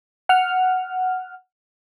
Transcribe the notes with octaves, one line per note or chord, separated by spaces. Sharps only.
F#5 F6